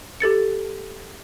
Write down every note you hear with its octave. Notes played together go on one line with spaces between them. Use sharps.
G4 A4 A6 C#7